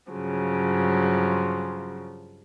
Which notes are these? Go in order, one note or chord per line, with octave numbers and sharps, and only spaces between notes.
G2 C#3 F3 F#3